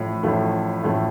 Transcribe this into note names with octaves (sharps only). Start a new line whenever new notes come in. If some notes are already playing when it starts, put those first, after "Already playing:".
Already playing: A1 A2 F3 A3
A1 A2 F3 A3
A1 A2 F3 A3